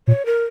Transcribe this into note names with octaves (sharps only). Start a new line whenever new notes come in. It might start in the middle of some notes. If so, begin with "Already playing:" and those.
A#2 C#5
A#4